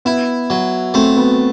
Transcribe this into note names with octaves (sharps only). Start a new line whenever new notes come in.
B3 E4
F#3
A3 C4
B3